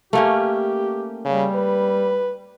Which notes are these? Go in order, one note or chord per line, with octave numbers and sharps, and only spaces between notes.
A3 A#3 C#4 G4
C#3 G3
B4